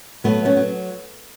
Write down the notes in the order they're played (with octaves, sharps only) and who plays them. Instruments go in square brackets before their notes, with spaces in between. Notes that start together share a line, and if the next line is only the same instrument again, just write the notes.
[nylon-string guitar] F#3 A3 B3
B3 C#4
F#3